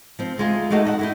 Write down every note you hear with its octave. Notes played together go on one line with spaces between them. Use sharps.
F3 C4
D2 G#3 F4 G#4
G#3 A3 D#4 F#4 G4 A4
A4 D#5 F#5
D#4 E4 F#4